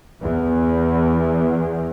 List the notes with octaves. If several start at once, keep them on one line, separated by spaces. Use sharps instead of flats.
E2